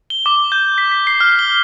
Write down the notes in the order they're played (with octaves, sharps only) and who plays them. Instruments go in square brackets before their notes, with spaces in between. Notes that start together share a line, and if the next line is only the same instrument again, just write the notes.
[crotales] G7
D6
G6
B6
B6
C7
F6
G7